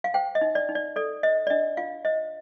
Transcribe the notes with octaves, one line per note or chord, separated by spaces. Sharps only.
F5
C5 G5
D#5
D#4
D5
D#4
D5
A4 D5
C5 D#5
D5
D4 D#5
F4 F5
C5 D#5